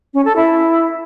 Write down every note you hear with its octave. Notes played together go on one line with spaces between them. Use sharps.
C#4
A4
E4